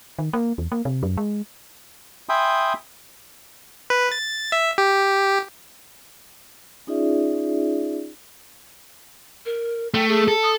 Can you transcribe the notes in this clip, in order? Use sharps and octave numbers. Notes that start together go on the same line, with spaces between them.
D#3
A#3
E2
A#3
C3
F#2
G#3
E5 G5 G#5 B5 C6 D#6
B4
A6
E5
G4
C#4 D#4 F4 G#4 D5 E5
A#4
A3 G5
G#4
A4
D#6